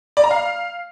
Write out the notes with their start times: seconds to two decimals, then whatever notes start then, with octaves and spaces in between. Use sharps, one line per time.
0.17 D5
0.24 A#5
0.31 F5